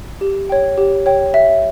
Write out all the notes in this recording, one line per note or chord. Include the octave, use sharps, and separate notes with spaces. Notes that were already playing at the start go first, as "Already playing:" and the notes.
G4
C#5 G5
G4
C#5 G5
E5